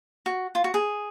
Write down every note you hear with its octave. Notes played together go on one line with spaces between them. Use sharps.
F#4
F4
F#4
G#4